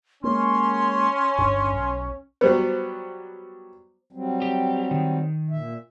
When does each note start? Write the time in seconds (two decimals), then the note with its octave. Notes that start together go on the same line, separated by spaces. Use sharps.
0.23 G#3 A#3 C#4 C6
1.38 D1 G1 G2
1.73 B1
2.41 F#3 G3 B3 B4 C5
4.13 F#3 G3 C4
4.42 G4
4.91 D#3
5.50 A#2 E5